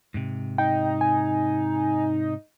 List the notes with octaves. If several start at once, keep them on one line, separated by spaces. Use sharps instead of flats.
G#2 C3
D#4 G5
G#5